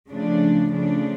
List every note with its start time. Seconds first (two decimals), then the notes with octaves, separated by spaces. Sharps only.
0.09 C#3 F3 A3 D4
0.70 C#3 F3 A3 D4